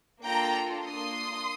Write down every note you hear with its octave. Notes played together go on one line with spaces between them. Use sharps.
A#3 D4 F4 A4 G5 A#5
A#3 D4 F4 C6 D#6